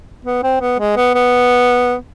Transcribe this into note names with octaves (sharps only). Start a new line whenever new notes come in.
B3
C4
B3
G#3
B3
B3